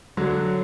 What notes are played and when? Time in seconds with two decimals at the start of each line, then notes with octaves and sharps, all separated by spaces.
0.17 D3 F#3